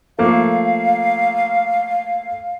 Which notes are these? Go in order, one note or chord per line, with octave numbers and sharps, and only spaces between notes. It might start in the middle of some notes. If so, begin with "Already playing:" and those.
F3 A3 A#3 F5